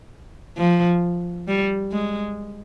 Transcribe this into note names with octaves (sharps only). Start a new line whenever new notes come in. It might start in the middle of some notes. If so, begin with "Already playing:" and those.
F3
G3
G#3